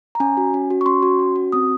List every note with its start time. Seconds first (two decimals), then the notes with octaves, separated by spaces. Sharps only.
0.15 A#5
0.20 C#4 G#5
0.37 F#4
0.54 C#4
0.70 F#4
0.81 C#6
0.86 C#4 C6
1.02 F#4
1.19 C#4
1.36 F#4
1.52 C4 D#6